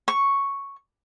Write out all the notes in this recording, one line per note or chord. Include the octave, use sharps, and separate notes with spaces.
C#6